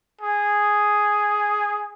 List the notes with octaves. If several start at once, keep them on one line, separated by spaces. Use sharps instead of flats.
G#4